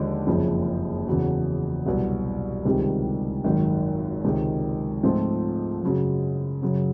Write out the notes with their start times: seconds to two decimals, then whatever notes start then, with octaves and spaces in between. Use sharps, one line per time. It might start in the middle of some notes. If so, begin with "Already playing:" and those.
Already playing: D#2 D3 F3 G#3
0.27 F#1 F2 C#3 F3
1.07 E2 C#3 F#3
1.86 C2 B2 F#3
2.65 C#2 C3 D#3 G3
3.44 G#1 F#2 D#3
4.25 C#2 C3 D#3
5.03 G#2 F3 A3 C4 F4
5.83 F#2 C#3 F#3
6.62 F#2 C#3 F#3